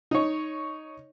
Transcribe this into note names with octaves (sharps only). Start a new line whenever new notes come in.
D#4 C#5